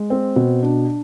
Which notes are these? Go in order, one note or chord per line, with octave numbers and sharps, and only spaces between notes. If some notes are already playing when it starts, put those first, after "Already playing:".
Already playing: G#3
C4
B2
D4